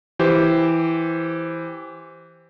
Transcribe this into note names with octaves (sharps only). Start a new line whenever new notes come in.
E3 G4 C5